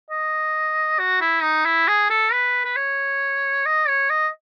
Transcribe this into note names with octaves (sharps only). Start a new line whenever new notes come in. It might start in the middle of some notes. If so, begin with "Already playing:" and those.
D#5
F#4
E4
D#4
E4
G#4
A4
B4
B4
C#5
D#5
C#5
D#5